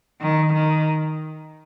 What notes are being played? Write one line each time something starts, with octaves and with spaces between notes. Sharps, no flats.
D#3
D#3